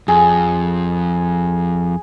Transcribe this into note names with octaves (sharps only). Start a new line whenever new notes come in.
F2 G#4